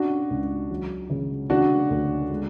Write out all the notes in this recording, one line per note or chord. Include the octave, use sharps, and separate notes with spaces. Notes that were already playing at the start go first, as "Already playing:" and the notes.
Already playing: C#4 D4 F#4
C#2
F#3
C#3
C#3 D4 F#4
D2
G#3